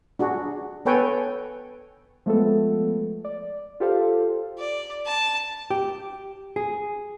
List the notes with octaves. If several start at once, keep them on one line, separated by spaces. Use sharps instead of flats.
D4 F#4 G#4
B3 A4 B4 C#5 G5 G#5
F3 G#3 A3 B3 A4
D5
F4 G4 A4 C5 F5
D5
A5
G4
G#4